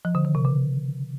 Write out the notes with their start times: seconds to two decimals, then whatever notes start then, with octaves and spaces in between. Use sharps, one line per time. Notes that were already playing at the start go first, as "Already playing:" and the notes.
0.05 F3
0.15 D3
0.25 D#3
0.35 C3
0.45 C#3